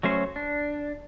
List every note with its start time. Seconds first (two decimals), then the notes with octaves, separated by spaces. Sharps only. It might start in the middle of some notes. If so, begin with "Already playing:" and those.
0.03 F#3 A3 C#4 C5
0.36 D4